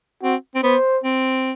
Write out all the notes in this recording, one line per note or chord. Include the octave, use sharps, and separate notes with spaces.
C4 F#4
C4
B3 C5
C4